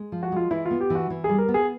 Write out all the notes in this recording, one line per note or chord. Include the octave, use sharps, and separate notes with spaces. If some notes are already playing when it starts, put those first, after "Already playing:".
Already playing: G#3
F3
F#4
G#3 F4
E3 E4
F4
B3
G4
E3 F#4
E3
G3 G#4
A#4
B3
G#4